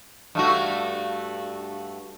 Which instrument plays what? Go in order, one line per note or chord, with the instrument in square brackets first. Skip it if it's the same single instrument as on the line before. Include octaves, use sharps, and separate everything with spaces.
[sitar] G2 A3 F#4